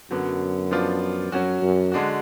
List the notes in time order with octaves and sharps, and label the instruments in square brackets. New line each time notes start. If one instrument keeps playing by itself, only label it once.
[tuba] F#2 [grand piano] D3 F#3 B3
[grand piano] F3 B3 D4 F4
[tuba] F#2 [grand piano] F#3 C#4 F#4
[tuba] F#2
[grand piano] D3 G#3 D4 F#4